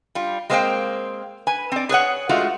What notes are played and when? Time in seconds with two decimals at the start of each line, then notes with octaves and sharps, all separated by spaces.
0.15 G3 F4
0.50 G#3 A#3 C4 C5 F5 G5
1.47 B4 G#5
1.72 C4 D5
1.89 G#4 B4 C#5 F#5
2.29 G#3 A3 F4 F#4